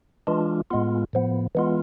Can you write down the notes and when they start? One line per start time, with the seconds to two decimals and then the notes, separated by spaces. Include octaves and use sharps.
0.27 E3 G#3 D4 F4
0.70 A2 G#3 B3 F4
1.13 A2 F3 B3
1.55 E3 G#3 B3 F4